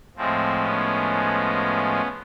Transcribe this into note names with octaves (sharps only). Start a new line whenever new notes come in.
A2 F3 G#3 C4
B3 C#4